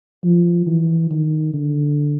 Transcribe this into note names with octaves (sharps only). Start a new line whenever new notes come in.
F3
E3
D#3
D3